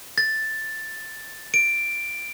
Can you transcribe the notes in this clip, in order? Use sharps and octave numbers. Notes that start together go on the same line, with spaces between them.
A6
D7